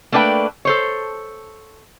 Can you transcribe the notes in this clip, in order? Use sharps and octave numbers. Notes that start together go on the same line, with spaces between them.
A3 A#3 D4 B4 G5
A4 C5 C#5